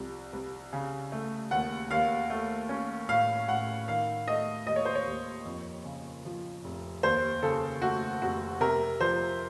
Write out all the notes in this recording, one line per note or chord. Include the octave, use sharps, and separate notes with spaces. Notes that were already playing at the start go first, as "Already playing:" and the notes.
Already playing: C2 F3
C2
C#3
A3
D#2 F#5
D#2 F5
A3
C#4
A2 F5
A2 F#5
D#3 F5
A3 D#5
D#2 D#5
C#5
C5
C#5
D#2
F2
C#3
F3
F1
D#2 C5
C#3 A4
A3 F#4
F1 F#4
C3 A#4
F3 C5